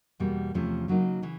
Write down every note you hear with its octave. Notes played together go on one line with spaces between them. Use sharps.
E2 B2 G3 A#3
E2 C3 F3 A3 C#4
C#3 F#3 A#3 D#4
C#3 E3